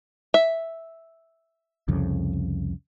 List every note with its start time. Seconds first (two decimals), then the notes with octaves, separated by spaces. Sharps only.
0.34 E5
1.88 C2 F2 C#3